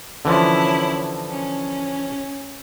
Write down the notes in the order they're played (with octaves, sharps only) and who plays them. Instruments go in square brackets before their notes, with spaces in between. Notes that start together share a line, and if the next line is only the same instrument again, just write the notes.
[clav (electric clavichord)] D3 E3 F3 [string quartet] C#4 E4
[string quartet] C#4